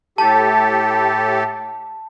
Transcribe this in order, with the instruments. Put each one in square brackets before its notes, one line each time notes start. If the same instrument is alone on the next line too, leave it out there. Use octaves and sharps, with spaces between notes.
[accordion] A2 G4 A4 [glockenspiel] A5